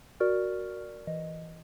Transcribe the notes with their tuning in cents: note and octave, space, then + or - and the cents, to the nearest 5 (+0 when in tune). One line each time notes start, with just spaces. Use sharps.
F#4 +0 A#4 +0 D5 +0
E3 +0 D#5 +0